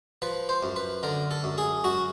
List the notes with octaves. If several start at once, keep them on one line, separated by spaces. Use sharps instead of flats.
F3 B4
C5
F#2
B4
D3 A#4
A4
F#2
G#4
F#2 F#4